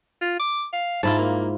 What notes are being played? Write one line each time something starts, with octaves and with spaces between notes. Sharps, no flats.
F4
D6
F5
G#2 E4 F4 A5
A#3